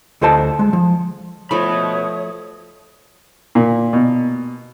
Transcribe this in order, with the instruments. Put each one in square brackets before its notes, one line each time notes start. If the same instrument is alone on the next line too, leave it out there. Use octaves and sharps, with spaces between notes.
[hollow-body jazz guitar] D2 F4 A4 C5 D#5 A5
G#3
F3
[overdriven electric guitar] B2 B5 [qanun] F3 A3 [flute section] C#5 D#6
[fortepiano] A#2
B2